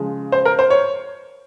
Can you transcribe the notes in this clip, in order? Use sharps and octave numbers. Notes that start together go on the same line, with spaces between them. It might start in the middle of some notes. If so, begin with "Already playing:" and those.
Already playing: C#3 F3 G#3
C5
A#4
C5
C#5